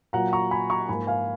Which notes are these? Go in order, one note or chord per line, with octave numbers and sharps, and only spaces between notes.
A#2 F#3 A#3 F#5 A#5
A#5 C#6
G#5 B5
A#5 C#6
G#2 F3 A#3 G#5 B5
F5 G#5